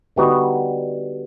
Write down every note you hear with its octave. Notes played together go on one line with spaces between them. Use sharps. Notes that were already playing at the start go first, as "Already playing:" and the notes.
D3 G3 B3 D#4 F#4